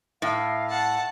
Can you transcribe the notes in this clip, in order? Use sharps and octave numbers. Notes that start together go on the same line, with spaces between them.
A2 F5
F#5 A5